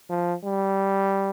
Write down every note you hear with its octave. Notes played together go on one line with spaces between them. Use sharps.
F3
G3